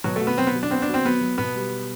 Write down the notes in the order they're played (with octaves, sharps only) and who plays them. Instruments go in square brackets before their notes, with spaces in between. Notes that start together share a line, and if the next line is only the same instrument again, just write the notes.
[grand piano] B2 [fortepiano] F#3
[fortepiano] A3 [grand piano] F#4
[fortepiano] B3
[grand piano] F#3 [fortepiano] C4
[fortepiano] B3
[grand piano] F#3
[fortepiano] D4
[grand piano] B3 [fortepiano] C4
[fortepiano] D4
[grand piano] F#4
[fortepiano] C4
[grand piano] F#3 [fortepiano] B3
[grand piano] F#3
[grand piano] B2 [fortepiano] B3
[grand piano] G3